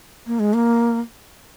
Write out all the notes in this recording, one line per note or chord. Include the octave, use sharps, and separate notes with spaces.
A#3
G#3
A#3